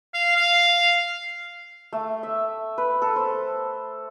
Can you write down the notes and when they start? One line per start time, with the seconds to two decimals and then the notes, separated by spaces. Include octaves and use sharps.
0.14 F5
0.36 F5
1.93 A3
2.23 E5
2.78 B4
3.02 A4
3.16 C5